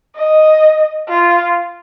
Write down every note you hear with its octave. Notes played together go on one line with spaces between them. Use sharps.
D#5
F4